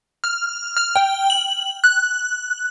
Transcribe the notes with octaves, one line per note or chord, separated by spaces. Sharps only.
F6
F6
G5
F#7
F#6